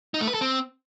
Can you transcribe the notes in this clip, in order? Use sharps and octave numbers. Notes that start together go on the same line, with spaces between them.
D#4
A3
B4
A4
C4